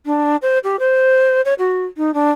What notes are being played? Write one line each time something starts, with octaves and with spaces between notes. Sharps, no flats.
D4
C5
G4
C5
C#5
F#4
D#4
D4